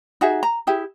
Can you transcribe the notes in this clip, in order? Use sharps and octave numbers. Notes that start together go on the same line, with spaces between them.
D#4 F#4 G#4 E5
A#5
E4 G4 G#4